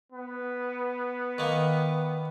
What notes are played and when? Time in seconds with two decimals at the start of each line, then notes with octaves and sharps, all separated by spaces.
0.12 B3
1.38 D#3 A#3